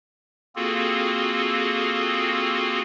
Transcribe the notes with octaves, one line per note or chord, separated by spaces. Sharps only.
A#3 C4 F4 F#4 G#4 A4